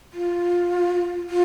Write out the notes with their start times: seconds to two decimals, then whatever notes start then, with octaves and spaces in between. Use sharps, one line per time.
0.13 F4
1.29 F4